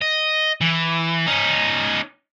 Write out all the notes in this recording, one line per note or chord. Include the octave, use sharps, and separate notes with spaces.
D#5
E3
C#4 D#4